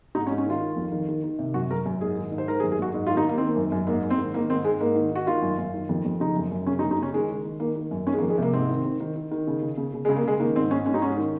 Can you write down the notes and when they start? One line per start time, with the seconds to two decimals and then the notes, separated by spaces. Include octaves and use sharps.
0.15 G#2 D#4
0.27 C#4
0.30 G#2
0.38 C#4
0.46 D#3 F4
0.61 D#3
0.76 F2
0.92 D#3
1.08 D#3
1.24 D#3
1.39 C3
1.54 F#2 F#4
1.70 F#2 A#4
1.86 F#2
2.01 G#2 G#4
2.17 D#3
2.32 G#2
2.38 C5
2.48 D#3 A#4
2.60 G#4
2.63 F#2
2.72 G#4
2.79 F#2 F#4
2.94 G#2
3.07 F4
3.09 D#3
3.17 D#4
3.25 D#3 A#3
3.38 D#3 C4
3.47 A#3
3.56 F#2
3.72 F#2
3.87 G#2 A#3
4.03 G#2
4.10 C4
4.18 D#3
4.34 D#3 A#3
4.50 G#2 C4
4.65 G#2 G#3
4.81 G#2 A#3
4.96 D#3
5.11 D#3 F#4
5.27 D#3 F4
5.42 F#2
5.58 F#2
5.74 D#3
5.89 F2
6.05 F2
6.20 C#3 D#4
6.36 F#2
6.52 F#2
6.66 C#3 C#4
6.79 D#4
6.83 F#2
6.91 D#4
6.98 C#3 C#4
7.14 D#3 G#3
7.29 D#3
7.45 D#3
7.60 D#3 A#3
7.76 D#3
7.91 F#2
8.07 D#3 C#4
8.13 G#3
8.18 A#3
8.23 F2
8.30 G#3
8.38 C3 A#3
8.53 G#2 C4
8.69 D#3
8.85 D#3
9.00 D#3
9.16 D#3
9.32 D#3
9.47 C#3
9.62 C#3
9.77 C#3
9.94 C#3
10.05 G#3
10.09 C#3
10.16 A#3
10.24 C#3 G#3
10.40 D#3 A#3
10.56 G#2 C4
10.71 G#2 C#4
10.86 G#2 C#4
10.94 D#4
11.01 G#2 C#4
11.17 D#3